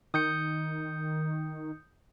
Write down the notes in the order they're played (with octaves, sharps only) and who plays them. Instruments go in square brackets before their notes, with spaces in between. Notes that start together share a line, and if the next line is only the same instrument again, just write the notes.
[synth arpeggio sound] D#3 [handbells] D#6 G6 C#7